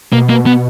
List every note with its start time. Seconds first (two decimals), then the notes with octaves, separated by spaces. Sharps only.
0.12 B2 A#3
0.29 A#3
0.46 B3